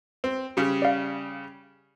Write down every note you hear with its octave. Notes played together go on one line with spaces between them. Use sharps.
C4
C#3 G3
D5 F5